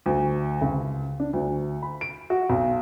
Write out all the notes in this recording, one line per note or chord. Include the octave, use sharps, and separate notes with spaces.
D2
C#2
D4
D2
B5
D7
F#4
B1